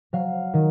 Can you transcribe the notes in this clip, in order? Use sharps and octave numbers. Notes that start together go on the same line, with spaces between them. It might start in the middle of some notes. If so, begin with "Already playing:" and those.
F#3 F5
D#3